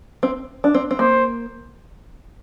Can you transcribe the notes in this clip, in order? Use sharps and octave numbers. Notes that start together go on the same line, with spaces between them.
C4
D4
C4
C4
A#3 C5